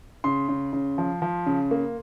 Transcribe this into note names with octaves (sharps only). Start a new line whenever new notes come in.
C#3 C6
C#3
C#3
F3
F3
C#3
A#3